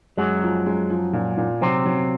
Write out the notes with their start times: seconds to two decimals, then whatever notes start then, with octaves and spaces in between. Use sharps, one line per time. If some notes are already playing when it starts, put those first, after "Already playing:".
0.17 F#2 F#3 G#3
0.42 F3
0.66 G#3
0.89 F3
1.13 A#2
1.37 A#2
1.61 C3 F#3 C4
1.85 F#3